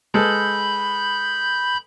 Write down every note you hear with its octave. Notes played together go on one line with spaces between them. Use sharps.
G#3 A4 B4 B5 G6